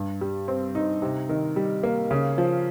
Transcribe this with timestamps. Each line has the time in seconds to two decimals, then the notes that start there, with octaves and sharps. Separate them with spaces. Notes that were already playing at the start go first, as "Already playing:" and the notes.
Already playing: G2
0.21 G3
0.48 C4
0.75 D#4
1.02 C3
1.29 D#3
1.56 G3
1.83 A#3
2.11 C#3
2.38 F3